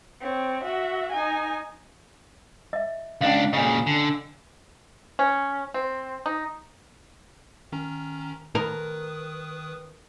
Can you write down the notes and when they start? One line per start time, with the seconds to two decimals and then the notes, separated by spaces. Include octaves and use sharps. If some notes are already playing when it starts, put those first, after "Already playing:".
0.21 C4 C#5
0.64 F#4 E5
1.12 D#4 G#5
2.73 D#5 E5
3.21 C#2 C#4 D4 D#5 F5
3.53 A#2 C#3 D#5 G#5
3.87 D3
5.19 C#4
5.74 C4
6.26 D#4
7.72 D#3 C#4 A#5
8.55 D#3 A#4 B4 D#6